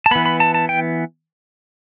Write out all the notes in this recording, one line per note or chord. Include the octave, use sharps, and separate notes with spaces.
A5
E3 B3 B5
B5
A5
A5
G5